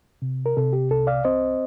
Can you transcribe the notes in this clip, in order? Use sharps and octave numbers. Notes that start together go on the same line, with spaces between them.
C3
A#4
C3 A4
G4
C2 A4
D5 F5
C4 C5 D#5